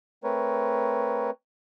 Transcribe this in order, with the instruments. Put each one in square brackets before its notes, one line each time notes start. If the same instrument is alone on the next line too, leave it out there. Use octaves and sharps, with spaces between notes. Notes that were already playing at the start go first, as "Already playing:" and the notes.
[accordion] A3 C4 A#4 B4 C#5